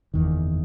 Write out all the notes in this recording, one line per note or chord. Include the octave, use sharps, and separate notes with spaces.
F#1 E2 D#3